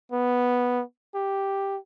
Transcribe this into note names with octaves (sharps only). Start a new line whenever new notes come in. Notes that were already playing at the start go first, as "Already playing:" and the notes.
B3
G4